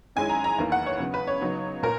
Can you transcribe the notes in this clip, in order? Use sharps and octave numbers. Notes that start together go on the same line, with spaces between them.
F#2 D#3 G#3 C#4 E4 G#5
A#5
A#5
E2 D#3 A#3 E4
F#5
C#5
C#3 F#3 B3
B4
C#5
C#3 F#3 B3 D#4
A#2 A#4